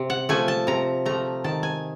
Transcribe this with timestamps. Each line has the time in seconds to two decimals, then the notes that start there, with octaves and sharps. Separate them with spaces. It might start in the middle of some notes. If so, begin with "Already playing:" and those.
Already playing: C3
0.10 F#5
0.29 F3 A3 G#5
0.48 A5
0.67 C3 A#5
1.06 F3 A3 A#5
1.44 D#3 A5
1.63 G#5